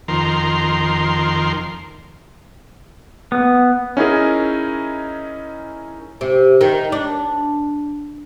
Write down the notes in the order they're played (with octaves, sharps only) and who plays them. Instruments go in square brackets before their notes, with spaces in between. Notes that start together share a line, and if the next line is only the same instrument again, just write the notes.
[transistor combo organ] F2 D#3 A#4 C6
[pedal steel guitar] B3
[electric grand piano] C#4 D#4 E4 G#4 A#4
[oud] C3
D#3
D4